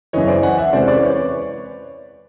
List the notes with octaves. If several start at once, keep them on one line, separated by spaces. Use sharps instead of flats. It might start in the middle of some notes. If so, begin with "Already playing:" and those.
F#2 C#3 E3 C#5 D#5
C5 D5
F#5 G#5
E5 F#5
C3 E3 G#3 C#4 C5 D5
C5 D5
B4 C#5
C#5